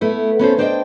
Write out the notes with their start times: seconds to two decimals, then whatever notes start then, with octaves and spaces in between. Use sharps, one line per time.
0.01 A3 B3 E4
0.39 B3 C#4 A4 C5
0.58 D4 C5 D5 D#5 G5